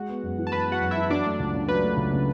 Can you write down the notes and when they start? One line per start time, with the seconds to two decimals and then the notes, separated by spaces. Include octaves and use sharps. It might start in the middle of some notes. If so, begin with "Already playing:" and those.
Already playing: G#3 F#4 F#5
0.09 B3
0.23 F#2
0.38 E3
0.47 A5
0.52 G#3 B4 B5
0.67 B3
0.72 F#4 F#5
0.81 F#2
0.91 E4 E5
0.96 E3
1.10 F#3 D4 D5
1.26 A3
1.40 C#2
1.54 C#3
1.68 F#3 B4
1.84 A3
1.97 C#2
2.13 C#3